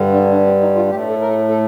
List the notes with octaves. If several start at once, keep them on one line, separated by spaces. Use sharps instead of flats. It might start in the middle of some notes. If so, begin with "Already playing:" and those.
Already playing: G2 D3 G3
D4
D4
C4
D#4
F4
A2 A3 G4
A4
A#4
A4
A4